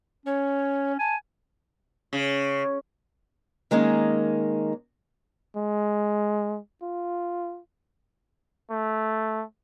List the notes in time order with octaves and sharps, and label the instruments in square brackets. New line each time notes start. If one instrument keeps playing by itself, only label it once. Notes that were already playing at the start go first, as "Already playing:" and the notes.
[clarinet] C#4 [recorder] C#5
[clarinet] G#5 [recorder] A5
[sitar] C#3
[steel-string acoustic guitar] D#3 G#3 A#3 C#4 D#4
[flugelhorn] G#3
F4
A3